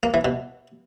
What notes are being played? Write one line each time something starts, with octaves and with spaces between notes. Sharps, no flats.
A#3
E3
B2